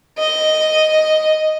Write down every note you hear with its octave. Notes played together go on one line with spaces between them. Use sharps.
D#5